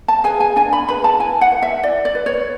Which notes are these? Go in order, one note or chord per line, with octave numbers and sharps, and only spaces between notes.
A5
G#4 B4 G#5
G#5
D4 G#5
B5
G#4 B4 B5
A5
E4 G#5
F#5
B4
E5
E4 D5
D5
B4
C#5